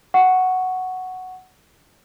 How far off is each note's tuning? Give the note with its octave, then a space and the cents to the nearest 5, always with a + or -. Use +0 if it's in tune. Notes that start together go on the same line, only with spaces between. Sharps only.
F#5 +0 C#6 +0